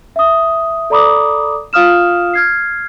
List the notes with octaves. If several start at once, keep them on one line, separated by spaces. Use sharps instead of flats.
E5 D#6
A4 D5 A#5 B5 D6 D#6
F4 F5 D#6 F6 E7
F6 G#6 C7